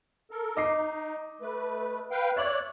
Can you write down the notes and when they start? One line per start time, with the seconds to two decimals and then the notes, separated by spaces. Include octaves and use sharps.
0.31 A4 A#4
0.57 D#4 D#5 D6 C7
1.41 A3 B4
2.11 B4 F5 G5
2.37 C#5 D5 E5 F#6